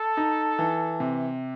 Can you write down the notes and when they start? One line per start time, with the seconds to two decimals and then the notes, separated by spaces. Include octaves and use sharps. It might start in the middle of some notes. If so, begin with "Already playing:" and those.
Already playing: A4
0.17 D#4
0.59 E3
1.00 C3